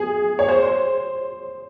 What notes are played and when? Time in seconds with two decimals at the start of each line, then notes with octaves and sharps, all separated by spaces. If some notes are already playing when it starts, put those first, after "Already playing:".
Already playing: G#4
0.39 C#5
0.49 C5